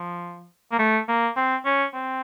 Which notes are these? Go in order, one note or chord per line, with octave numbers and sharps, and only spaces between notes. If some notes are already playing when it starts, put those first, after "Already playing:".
Already playing: F3
A#3
A3
A#3
C4
C#4
C4